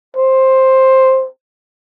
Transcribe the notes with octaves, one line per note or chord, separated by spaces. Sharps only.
C5